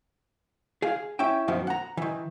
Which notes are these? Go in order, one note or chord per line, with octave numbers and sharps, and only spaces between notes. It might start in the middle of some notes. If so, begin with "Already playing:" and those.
G#4 F5
C#4 E4 E5 G5
F#2 B2 D#3 F3
F#5 A#5
D#3 E3